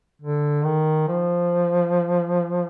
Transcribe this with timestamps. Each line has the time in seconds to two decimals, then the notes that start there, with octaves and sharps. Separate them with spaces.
0.22 D3
0.64 D#3
1.08 F3